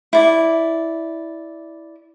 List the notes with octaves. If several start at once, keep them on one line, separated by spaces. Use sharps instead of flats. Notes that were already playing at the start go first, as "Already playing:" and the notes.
E4 D5